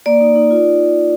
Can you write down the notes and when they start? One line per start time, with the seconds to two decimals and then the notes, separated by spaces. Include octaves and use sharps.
0.06 A#3 D5
0.21 D#4
0.36 D#4
0.50 F4